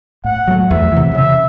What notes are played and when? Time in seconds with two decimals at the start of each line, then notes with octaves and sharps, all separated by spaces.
0.24 A2 F#5
0.48 F#3 A3
0.69 E2 E5
0.92 C3 E3
1.14 C#3 E5